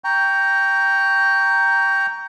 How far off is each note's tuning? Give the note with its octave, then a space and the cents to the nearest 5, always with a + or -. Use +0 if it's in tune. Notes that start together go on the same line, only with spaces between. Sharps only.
G5 +0 A#5 +0 C#6 +20